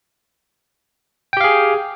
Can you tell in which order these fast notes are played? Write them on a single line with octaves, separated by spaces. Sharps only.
G5 G4 F5 G#4